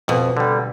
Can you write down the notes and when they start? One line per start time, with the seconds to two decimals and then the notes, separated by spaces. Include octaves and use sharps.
0.08 F2 B2
0.37 D3 G3